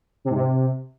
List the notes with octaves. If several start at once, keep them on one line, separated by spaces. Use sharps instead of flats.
C3
G#2
C3